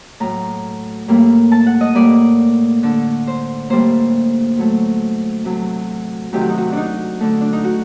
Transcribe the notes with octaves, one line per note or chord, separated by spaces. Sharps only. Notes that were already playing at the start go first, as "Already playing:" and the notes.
A2 F#3 A3 A#5
A2 G3 A#3
A5
F#5
D#5
A2 G3 A#3 D5
D3 A3
C5
A2 G3 A#3 C5
A2 F#3 A3
C3 F#3 A3
C3 D#3 F#3 A3 G4
F#4
D#4
F#4
D4 D#4
D3 A3
D4
D#4
F#4